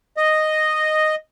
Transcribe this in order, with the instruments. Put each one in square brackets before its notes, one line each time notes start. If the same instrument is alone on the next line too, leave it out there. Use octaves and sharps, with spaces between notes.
[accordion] D#5